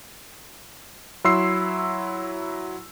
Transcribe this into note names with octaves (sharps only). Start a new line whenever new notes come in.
F#3 E4 C6 E6 C7